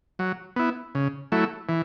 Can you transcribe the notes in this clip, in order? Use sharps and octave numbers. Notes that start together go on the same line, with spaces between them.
F#3
B3 E4
C#3
F#3 A3 E4
E3